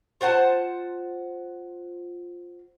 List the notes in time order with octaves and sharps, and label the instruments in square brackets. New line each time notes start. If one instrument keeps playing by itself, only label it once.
[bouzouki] F4 C5 F#5 A5